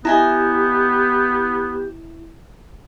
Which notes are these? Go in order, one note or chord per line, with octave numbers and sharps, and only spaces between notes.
B3 E4 G4 D#5 G#5 A#5